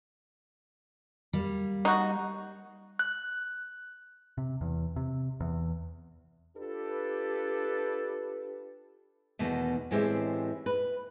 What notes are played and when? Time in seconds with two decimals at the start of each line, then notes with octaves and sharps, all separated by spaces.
1.33 G3 A#3
1.85 D#4 F#4
2.99 F#6
4.38 C3
4.61 E2
4.96 C3
5.40 E2
6.57 D4 F4 G4 A4 B4
9.39 E2 B2 D#3 A3
9.91 A2 E3 G#3 C4 G4 E5
10.66 B4